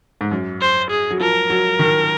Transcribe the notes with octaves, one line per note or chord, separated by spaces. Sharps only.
G#2
F#2
C5
G#4
F#3
F3 A#4
F#3
D#3